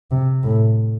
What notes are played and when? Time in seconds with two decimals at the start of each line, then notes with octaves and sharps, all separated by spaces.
0.11 C3
0.43 A2